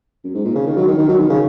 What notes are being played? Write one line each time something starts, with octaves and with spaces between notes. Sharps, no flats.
F#2
G#2
A#2
C#3
D#3
F#3
D#3
D#3
F#3
D#3
C#3